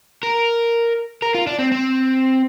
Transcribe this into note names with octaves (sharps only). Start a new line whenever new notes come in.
A#4
A#4
F4
D4
C4
C4